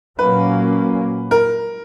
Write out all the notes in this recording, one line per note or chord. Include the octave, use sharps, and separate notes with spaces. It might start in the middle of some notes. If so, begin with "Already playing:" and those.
A#2 F#3 A#3 C#4 B4
A#4